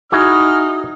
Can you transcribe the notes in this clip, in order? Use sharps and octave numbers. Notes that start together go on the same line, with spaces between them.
D#4 E4 F#4 G#4 D#6 F6